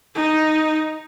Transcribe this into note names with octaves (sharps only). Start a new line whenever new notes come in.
D#4